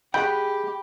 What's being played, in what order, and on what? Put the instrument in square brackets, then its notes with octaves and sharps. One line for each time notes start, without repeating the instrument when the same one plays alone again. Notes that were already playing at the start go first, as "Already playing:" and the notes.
[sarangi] G4 [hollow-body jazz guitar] G#4 D#5 F#5 [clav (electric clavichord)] G5 [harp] B5